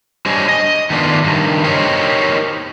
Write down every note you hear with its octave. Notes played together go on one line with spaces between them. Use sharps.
G3 D4 C5 C#5 D#5 G#5
D#5
D#3 A3 B3 D4 F4
G2 D#3
D#4 G4 A#4 C5 C#5 D#5